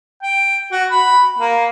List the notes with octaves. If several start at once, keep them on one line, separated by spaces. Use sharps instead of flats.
G5
F#4
B5
A#3